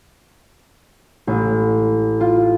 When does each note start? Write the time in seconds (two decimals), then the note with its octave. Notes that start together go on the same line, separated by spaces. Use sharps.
1.27 A1
2.20 F4